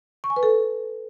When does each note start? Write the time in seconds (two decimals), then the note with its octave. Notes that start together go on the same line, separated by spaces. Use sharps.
0.24 C#6
0.30 G#5
0.36 B4
0.43 A4